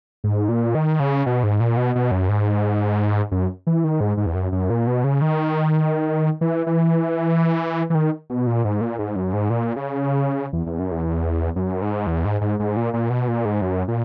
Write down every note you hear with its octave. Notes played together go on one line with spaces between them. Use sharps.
G#2
A#2
D#3
C#3
B2
G#2
A#2
B2
B2
F#2
G#2
F#2
E3
D#3
G#2
G#2
E2
F#2
F#2
A#2
B2
C#3
D#3
E3
E3
E3
D#3
B2
A#2
G#2
A#2
G#2
F#2
G#2
A#2
C#3
E2
E2
F#2
E2
F#2
G#2
E2
G#2
G#2
G#2
A#2
A#2
B2
A#2
G#2
F#2
A#2